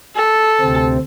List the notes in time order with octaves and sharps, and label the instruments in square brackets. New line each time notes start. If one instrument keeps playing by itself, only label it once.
[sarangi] A4
[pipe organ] D2 C3 C4